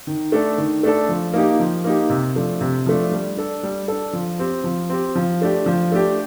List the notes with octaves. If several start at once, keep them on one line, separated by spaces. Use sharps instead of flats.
D#3
A3 D4 A4
D#3
A3 D4 A4
F3
A#3 D#4 G4
F3
A#3 D#4 G4
C3
F3 A3 D4
C3
F3 A3 D4
G3
D4 A4
G3
D4 A4
F3
C4 G4
F3
C4 G4
F3
A3 D4 G4
F3
A3 D4 G4